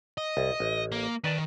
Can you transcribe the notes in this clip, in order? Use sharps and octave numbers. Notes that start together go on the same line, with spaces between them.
D#5
C2
A1
A#3
D#3 B4 D5 A5